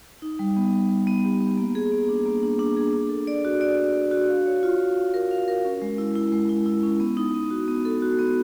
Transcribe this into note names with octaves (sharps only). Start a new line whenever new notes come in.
D#4
G3
B3
B3
G3
B3
G4
B3
A#3
G#4
A#3
D4
A#3
D4
D4
G#4
D4
A4
D5
F#4
D5
D5
F#4
F#4
F5
C#5
F4
F5
F5
A#4
F5
A#4
C#4
G#3
E4
E4
G#3
E4
E4
C#4
B3
D#4
B3
F#4
B3
A4
F#4
B3